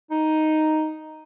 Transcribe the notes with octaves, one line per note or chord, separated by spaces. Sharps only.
D#4